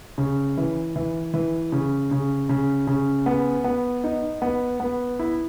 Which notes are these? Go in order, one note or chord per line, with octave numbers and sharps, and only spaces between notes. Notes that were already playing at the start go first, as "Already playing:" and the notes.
C#3
E3
E3
E3
C#3
C#3
C#3
C#3
B3
B3
D#4
B3
B3
E4